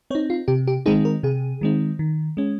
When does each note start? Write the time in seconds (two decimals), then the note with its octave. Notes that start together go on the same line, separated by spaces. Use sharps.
0.10 C4 C#5
0.15 D#4
0.30 F4
0.48 C3 G4
0.67 G4
0.86 D#3 G#3 C4 D#4 G#4
1.05 A#4
1.23 C3 G#4
1.61 D#3 G#3 C4 D#4
1.99 D#3
2.37 G#3 C#4